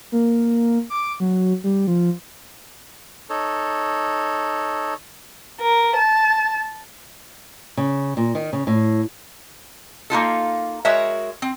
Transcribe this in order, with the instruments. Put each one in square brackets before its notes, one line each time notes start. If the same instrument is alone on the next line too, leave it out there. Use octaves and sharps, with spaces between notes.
[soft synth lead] A#3
D6
F#3
G3
F3
[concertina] D#4 A4 C#5
[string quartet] A#4
A5
[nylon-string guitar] C#3
A#2
D#3
C#3
A2
[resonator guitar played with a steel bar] A#3 D#4 F4 A4
G#3 F#4 A#4 C#5 E5
C4